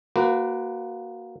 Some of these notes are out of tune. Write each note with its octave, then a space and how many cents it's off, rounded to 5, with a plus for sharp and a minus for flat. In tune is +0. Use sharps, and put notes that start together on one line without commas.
A#3 +0 F#4 +0 B4 +30